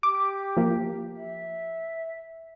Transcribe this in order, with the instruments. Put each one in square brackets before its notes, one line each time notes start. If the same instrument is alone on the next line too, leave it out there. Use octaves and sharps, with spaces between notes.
[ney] G4 [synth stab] D6
[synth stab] F3 A#3
[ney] E5